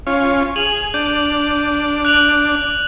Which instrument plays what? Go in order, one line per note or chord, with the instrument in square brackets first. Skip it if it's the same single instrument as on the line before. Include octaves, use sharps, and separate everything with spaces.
[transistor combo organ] C#4 F4
[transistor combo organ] G#4 [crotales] D#7 F7 F#7
[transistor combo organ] D4 [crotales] G6
[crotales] F#6 F7 F#7